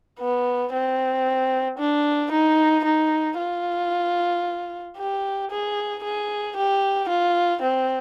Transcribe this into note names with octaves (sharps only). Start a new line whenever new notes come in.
B3
C4
D4
D#4
D#4
F4
G4
G#4
G#4
G4
F4
C4